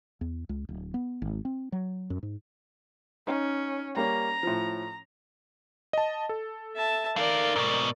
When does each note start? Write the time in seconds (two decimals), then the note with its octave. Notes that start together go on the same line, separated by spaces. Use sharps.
0.21 E2
0.49 C#2
0.69 D1
0.94 B3
1.22 G#1
1.45 C4
1.72 F#3
2.10 F#2
2.23 G#2
3.27 C#4 D#4
3.96 G3 A#3 C#4 A#5
4.43 A2 F3
5.93 D#5 A5
6.29 A4
6.76 E5 A5
7.16 D#4 A#4 D5 F5
7.56 G#2 B2